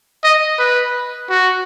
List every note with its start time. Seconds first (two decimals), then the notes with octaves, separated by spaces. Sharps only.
0.24 D#5
0.59 B4
1.30 F#4